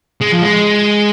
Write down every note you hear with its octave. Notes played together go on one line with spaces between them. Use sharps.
G#3
F3
G#3